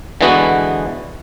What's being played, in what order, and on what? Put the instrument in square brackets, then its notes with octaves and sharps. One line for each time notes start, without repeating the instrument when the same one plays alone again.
[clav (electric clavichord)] D3 E3 G#3 B3 F#4